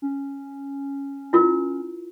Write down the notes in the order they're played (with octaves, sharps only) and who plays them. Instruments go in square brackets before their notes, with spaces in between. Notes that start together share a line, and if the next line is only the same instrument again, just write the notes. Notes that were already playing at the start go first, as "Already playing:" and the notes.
[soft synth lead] C#4
[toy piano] E4 F4 A#4